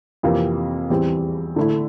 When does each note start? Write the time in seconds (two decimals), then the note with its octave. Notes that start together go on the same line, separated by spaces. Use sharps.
0.23 F2 C3 E3 A#3
0.90 E2 E3 G3 C4
1.56 D3 A3 E4